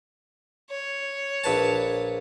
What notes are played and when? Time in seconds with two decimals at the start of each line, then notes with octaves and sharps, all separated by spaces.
0.70 C#5
1.44 A#1 B4 A5